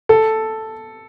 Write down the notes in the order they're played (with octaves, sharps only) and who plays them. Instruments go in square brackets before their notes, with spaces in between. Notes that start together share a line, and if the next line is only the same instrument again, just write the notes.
[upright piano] A4